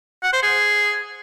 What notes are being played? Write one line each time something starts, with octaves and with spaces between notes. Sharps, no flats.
F#5
C5
G#4